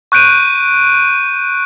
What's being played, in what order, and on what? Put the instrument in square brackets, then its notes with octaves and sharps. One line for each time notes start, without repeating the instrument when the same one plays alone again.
[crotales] C#6 F#6 G6 D7 D#7